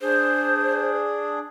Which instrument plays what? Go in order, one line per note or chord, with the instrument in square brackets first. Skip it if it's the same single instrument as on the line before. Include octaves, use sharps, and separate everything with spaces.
[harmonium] D4 G#4 [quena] C5